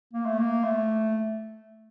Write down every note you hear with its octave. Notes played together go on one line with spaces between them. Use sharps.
A#3
A3
A#3
A3